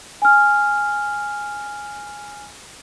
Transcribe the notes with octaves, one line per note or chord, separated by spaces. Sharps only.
G#5 F6